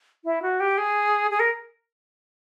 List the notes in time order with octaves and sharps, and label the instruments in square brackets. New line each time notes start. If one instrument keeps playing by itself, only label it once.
[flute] E4
F#4
G4
G#4
G#4
A#4